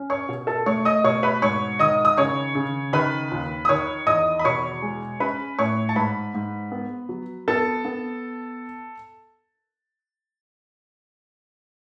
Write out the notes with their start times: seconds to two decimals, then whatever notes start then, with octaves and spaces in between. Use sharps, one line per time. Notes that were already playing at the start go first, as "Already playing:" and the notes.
Already playing: C#4
0.10 C#5 C#6
0.29 B2
0.47 A4 A5
0.66 A3 C#5 C#6
0.85 D#5 D#6
1.04 B2 C#5 C#6
1.23 B4 B5
1.42 G#2 C#5 C#6
1.79 D#3 D#5 D#6
2.05 D#6
2.17 C#3 C#5 C#6
2.55 C#3
2.93 D#3 B4 B5
3.32 D#2
3.65 D#6
3.69 D#3 C#5 C#6
4.07 E2 D#5 D#6
4.39 B5
4.45 B2 C#5 C#6
4.82 G#3
5.20 C#4 B4 B5
5.59 A2 C#5 C#6
5.89 A5
5.96 G#2 B4 B5
6.34 G#2
6.72 B3
7.09 F#3
7.48 B3 A4 A5
7.85 B3